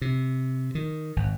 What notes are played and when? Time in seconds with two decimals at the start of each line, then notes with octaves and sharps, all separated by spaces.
0.02 C3
0.75 D#3
1.16 G#1